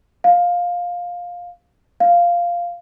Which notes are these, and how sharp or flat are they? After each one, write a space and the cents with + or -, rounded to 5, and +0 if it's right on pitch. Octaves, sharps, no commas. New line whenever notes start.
F5 +15
F5 -5